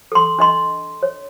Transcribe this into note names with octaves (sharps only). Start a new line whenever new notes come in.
A4 C6
D4 D#5 C6
C#5